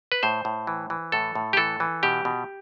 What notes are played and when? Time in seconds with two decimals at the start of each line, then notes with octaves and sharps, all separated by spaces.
0.12 B4
0.23 A2 C5
0.45 A2
0.67 E3
0.90 E3
1.12 A2 A4
1.35 A2
1.53 G4
1.57 E3 A4
1.80 E3
2.03 B2 G4
2.25 B2